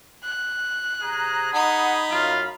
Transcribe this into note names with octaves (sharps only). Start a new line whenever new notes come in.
F#6
C3 G#4 A#5
D#4 F#5 B5
F#2 F4 F5